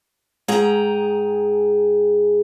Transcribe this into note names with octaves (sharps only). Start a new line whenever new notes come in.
G#2 G#4 G5 A#5